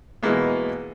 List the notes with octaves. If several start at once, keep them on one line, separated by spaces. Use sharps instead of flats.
B2 E3 G#3 A#3 B3